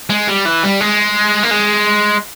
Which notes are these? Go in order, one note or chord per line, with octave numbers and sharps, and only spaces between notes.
G#3
G3
E3
G3
G#3
A#3
G#3